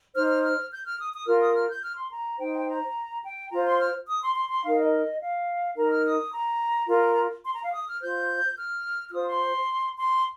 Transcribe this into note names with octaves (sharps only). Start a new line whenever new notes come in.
D#4 C5 F6
F6
F6
G6
F6
D#6
D#6
F4 A#4 F6
D#6
F6
G6
F6
C6
A#5
D#4 C5 G5
G5
A#5
G5
F4 C5 A#5
C6
F6
D#6
C6
C6
C6
D#4 A#4 F5
D#5
F5
D#4 A#4 A#5
F6
D#6
A#5
F4 A#4 A#5
C6
A#5
F5
D#6
F6
F4 C5 G6
F6
F6
F4 C5 D#6
C6
C6